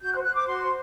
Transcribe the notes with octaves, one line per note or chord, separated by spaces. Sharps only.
F#4 G6
F#6
C5
F#6
C5 D6
F#4 C6
C5